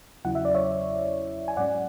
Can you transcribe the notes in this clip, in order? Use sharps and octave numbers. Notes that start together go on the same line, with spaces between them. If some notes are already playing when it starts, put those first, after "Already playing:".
E2 C#3 F#3 C#4 E4 F#5
E5
D5
C#5 E5
G#5
G#2 F#3 C#4 D5 F#5